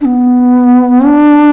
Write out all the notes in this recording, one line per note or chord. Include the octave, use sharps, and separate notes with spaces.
D4
B3
D4